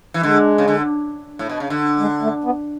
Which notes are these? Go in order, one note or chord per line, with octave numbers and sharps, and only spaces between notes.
E3
D3 G#3
C#3
D3
A2
B2
C#3
D3
G#3
A3
B3